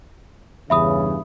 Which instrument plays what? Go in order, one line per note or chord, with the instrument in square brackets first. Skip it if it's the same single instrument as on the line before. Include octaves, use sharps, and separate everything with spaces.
[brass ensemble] E2 G2 C#3 [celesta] E5 B5 D#6